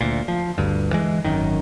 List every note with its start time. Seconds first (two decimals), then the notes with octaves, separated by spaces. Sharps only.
0.01 D2 A#2
0.28 F3
0.58 G1 D2 G2
0.93 E3 G#3
1.25 G#1 F#2 D#3